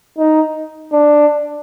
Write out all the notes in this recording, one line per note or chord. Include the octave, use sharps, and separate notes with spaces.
D#4
D4